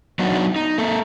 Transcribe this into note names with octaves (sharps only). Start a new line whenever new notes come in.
F#3 B3 D4 D#4 F#4
D#4
A#3 A4